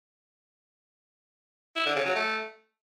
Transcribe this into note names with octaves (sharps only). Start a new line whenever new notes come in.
E4
D3
C#3
F#3
A3